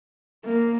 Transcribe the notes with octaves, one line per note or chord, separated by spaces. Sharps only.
A#3